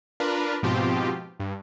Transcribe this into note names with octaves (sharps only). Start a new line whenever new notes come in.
D4 F4 A#4 B4
G#2 B2 F3 C4 F4 G4
G2